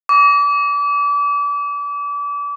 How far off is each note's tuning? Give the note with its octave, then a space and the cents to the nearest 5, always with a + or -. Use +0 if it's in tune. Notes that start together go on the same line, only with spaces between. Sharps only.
D6 -35